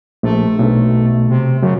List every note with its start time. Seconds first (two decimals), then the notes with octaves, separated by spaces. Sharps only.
0.23 A#1 A3
0.59 B1
1.29 C3
1.63 F#2 C#3